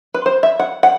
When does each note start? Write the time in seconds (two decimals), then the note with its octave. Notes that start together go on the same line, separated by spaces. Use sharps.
0.14 B4
0.26 C5
0.43 E5
0.59 F#5
0.83 F#5